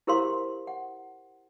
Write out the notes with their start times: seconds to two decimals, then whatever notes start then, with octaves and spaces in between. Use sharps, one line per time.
0.07 E4 G4 A#4 C5 F5 C6
0.67 F#5